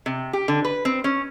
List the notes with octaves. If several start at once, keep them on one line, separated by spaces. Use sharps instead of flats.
C3
G4
D3
B4
C4
C#4